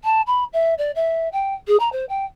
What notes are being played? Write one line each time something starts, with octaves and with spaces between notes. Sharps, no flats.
A5
B5
E5
D5
E5
G5
G#4
A#5
C5
G5